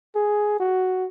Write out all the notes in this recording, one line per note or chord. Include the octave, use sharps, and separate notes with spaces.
G#4
F#4